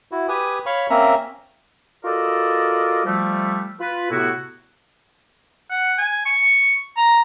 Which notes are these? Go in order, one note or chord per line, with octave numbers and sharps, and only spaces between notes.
E4 F#4
G4 B4 G#5 D#6
C#5 F5 B5 C#6
A#3 C4 C#4 E5 A#5
F4 F#4 A4 A#4 D5 D#5
F3 G3 A3
F4 B4
A2 C3 B3 E4 F#4
F#5
G#5
C#6
A#5